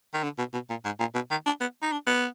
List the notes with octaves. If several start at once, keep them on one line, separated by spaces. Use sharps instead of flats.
D#3
D3
B2
B2
A#2
G#2
A#2
B2
D#3
D4
B3
D#4
D4
B3